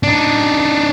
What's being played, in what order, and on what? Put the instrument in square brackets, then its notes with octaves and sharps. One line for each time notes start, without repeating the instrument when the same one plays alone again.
[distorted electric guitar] D4 D#4